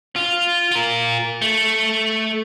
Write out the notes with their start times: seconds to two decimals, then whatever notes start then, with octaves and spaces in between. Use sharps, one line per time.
0.16 F4
0.72 F4 A#4
1.42 A3